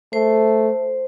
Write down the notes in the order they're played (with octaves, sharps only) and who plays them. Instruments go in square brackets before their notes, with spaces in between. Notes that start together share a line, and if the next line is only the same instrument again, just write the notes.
[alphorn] A3 [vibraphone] C5